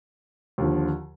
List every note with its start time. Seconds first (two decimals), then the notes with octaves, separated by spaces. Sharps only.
0.58 D#2 D3 F3